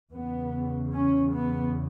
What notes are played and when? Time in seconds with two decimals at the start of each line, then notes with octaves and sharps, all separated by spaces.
0.12 E2 C#3 B3
0.93 C#4
1.32 B3